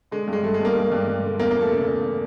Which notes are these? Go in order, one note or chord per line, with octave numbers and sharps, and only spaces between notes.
D3 G#3
G2 G#3
G2 A3
G#3
G2
A#3
G2
G2
G2
D3
E2 A#3
E3 A#3
A3
C#3 A3
E2